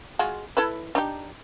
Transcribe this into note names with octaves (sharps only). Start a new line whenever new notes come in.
G#3 F4 F#4
E4 A4 B4
D4 D#4 G4